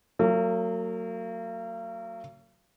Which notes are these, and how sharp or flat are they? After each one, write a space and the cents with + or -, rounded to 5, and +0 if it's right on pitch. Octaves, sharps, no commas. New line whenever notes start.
F#3 +0 A#3 -40